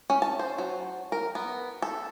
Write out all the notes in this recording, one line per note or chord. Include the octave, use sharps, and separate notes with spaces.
C#4
A5
C5
F#3
A#4
B3
A4